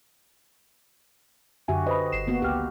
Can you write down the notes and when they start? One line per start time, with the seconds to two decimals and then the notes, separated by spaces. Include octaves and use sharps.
1.68 F#2 D3 F#4 G4 E5 G#5
1.87 B4 C5 D#5 B5
2.12 G1 C7 E7
2.27 A#3 B3 F#4
2.42 C#2 G4 F6